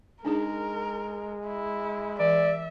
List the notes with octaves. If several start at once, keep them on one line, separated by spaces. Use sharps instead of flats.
G#3 D4 D#4 G#4 A#4
E4
E3 D5 E5